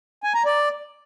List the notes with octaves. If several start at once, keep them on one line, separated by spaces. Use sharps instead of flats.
G#5
A#5
D5